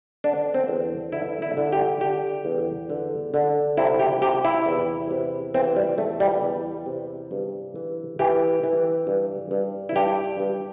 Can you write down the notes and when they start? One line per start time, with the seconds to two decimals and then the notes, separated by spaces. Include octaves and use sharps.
0.24 D3 D4
0.54 C4
0.68 E2
1.12 D3 E4
1.42 E4
1.57 D3
1.72 G4
2.01 D3 G4
2.45 E2
2.90 D3
3.34 D3
3.77 C3 E4
3.99 G4
4.21 C3 G4
4.45 E4
4.66 E2
5.11 C3
5.54 E3 C4
5.76 G3
5.98 E2 A3
6.20 G3
6.43 E2
6.86 C3
7.31 G2
7.76 E3
8.19 E3 G4
8.63 E3
9.07 G2
9.51 G2
9.89 E4
9.96 G2 G4
10.40 G2